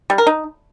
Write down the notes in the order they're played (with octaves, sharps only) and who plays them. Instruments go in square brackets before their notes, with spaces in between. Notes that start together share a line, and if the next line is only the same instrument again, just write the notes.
[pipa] G3
A#4
D#4